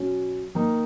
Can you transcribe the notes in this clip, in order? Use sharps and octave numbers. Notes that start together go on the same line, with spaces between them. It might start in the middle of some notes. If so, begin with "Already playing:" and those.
Already playing: B2 F#3 C#4
D#3 A#3 D#4